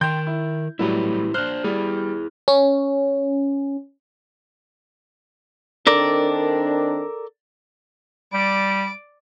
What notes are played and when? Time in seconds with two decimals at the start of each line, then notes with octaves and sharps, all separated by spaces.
0.01 D#3 A#4 G5 C6 G6
0.27 E4
0.79 A2 F#3 G3 E4 G4 B4
1.34 D4 C5 F6 F#6
1.64 G3 E4 G#4
2.48 C#4
5.87 D#3 C4 D4 A4 A#4 D5
8.33 G3 D5 D7